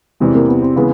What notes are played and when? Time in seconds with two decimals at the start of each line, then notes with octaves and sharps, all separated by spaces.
0.20 E2 C3 E3 G3 G#3
0.35 A#3
0.48 B3
0.62 C4
0.76 C#3 E3 G#3 B3